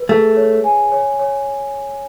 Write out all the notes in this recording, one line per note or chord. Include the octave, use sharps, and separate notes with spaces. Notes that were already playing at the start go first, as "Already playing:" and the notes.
Already playing: B4
A3 G#4
C#5
G#5
C#5
C#5